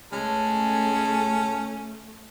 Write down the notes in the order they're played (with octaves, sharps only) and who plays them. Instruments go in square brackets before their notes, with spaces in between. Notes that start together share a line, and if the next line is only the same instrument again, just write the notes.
[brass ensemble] C#2 A5 [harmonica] G#3 [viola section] A3 [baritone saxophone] C#4